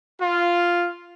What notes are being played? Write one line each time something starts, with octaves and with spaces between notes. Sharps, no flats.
F4